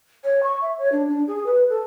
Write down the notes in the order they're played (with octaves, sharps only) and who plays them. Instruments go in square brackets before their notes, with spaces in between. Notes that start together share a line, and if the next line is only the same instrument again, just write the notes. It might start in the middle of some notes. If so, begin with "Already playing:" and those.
[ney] C#5
C#6
E5
C#5
D4
D4
G#4
B4
A4